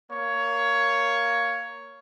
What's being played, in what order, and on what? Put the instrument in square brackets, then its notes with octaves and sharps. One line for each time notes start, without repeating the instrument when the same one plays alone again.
[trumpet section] A#3 C#5